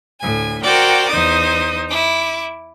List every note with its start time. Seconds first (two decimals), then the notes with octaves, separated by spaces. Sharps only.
0.21 D2 A2 G#5
0.63 F#4 A#4 C5 D5 G5
1.09 E2 D#4 C5 D#6
1.90 E4 D6